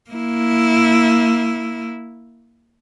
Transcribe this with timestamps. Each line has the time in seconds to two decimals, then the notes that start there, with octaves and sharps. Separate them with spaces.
0.10 A#3 E4